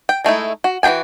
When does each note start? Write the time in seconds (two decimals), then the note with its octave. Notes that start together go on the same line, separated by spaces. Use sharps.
0.09 G5
0.24 G#3 A3 D#4 E4
0.64 F#4
0.83 E3 F#4 G#4 G5 G#5